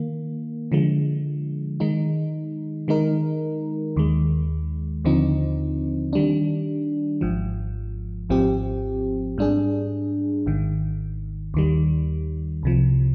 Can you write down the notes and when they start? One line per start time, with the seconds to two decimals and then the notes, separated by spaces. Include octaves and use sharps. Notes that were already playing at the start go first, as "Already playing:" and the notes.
Already playing: D#3 A#3
0.72 D3 F3 G#3
1.80 D#3 G#3 D#4
2.88 D#3 G#3 D#4 A#4
3.97 D#2 D#3 G#3
5.05 D#2 D3 F3 C4 D#4
6.13 D#3 G3 D4
7.21 G#1 G#2 F3
8.29 G#1 G#2 F3 C4 G4
9.38 G#2 G3 D4 G#4
10.46 G#1 G#2 D#3
11.54 D#2 D#3 G3
12.63 C2 C3 F3